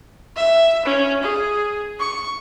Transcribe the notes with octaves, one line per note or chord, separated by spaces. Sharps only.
E5
C#4
G#4
C#6